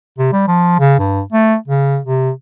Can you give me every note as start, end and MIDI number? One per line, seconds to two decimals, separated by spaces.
0.18 0.29 48
0.32 0.43 55
0.48 0.76 53
0.79 0.97 49
0.99 1.21 43
1.33 1.55 57
1.68 1.98 49
2.05 2.30 48